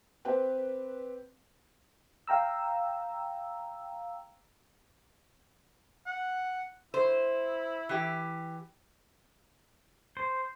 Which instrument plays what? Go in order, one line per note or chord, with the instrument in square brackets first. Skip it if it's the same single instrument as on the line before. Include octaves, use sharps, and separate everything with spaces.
[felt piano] C4 G4 B4
[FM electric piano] F5 G5 A#5 E6
[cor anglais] F#5
[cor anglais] E4 [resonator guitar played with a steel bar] C5
[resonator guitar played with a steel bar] E3 G4
[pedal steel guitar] C5